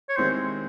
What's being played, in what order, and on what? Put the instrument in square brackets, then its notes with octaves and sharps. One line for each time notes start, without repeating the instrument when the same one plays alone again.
[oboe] C#5
[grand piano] D#3 G#3 C4 E4 G4 [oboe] C5